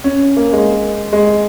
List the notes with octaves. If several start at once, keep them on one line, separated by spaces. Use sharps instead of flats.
C#4
A#3
G#3
G#3